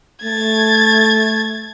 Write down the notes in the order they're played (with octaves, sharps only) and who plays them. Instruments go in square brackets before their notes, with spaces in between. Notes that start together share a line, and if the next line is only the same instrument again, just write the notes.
[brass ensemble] A3 [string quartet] G#6 A6